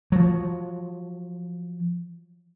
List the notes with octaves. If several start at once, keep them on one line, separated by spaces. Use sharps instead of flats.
F3 F#3